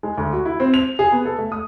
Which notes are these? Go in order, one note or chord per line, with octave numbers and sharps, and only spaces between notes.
G#3
D2
F#4
E4
C4
F7
G#4
B3
A4
A3
D#6